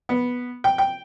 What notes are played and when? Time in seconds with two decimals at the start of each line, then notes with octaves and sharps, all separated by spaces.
0.09 B3
0.64 G5
0.78 G5